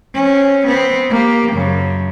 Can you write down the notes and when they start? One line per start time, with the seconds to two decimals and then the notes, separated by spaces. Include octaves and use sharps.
0.14 C4 C#4
0.66 B3 C4
1.10 A#3 G4
1.52 F#2 C#3